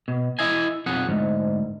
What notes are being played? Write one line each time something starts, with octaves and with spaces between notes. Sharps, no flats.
B2
E4 D#5 G#5
B1 F2 G#4 F#5
D2 G#2